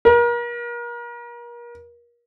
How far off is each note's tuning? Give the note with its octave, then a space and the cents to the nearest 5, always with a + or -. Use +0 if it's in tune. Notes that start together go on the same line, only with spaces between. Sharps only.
A#4 +35